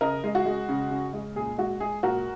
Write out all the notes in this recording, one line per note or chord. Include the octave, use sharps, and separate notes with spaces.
C#3 A#4 D#5
G#3
F#4
G#3
C#3
C#3
G#3
A#2 G#4
G#3 F#4
G#3 G#4
A#2 F#4 A#4